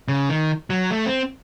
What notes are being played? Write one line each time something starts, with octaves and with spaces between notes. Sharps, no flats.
C#3
D#3
F#3
A3
C4